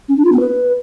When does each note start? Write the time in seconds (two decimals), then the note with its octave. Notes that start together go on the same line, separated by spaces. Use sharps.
0.08 C#4
0.16 D4
0.24 F4
0.32 B3
0.40 B4